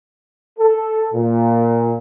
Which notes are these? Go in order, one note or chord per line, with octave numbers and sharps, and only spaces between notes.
A4
A#2